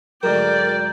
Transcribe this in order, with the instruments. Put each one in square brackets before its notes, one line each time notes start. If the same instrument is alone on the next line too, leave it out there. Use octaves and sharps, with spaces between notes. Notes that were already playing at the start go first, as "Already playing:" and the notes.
[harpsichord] D2 G#2 F#3 [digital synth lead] A#4 [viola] D5 [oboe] G5